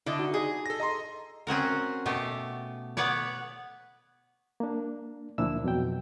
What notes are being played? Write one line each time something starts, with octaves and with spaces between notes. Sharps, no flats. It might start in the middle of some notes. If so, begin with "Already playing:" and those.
D3 E4 D#5
D#4 F#4
G#4 D#5
A4 A#6
D#5 A#5 C6
C4 C#4 F#4 A#4
B2 A3 G4
B3 B4 C#5 D5
A#3 D4
D2 A#2 F3 D4 E4 E6
F2 B2 F#3 G5